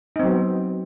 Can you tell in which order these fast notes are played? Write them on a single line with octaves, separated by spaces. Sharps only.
D#4 C4 F#3 B3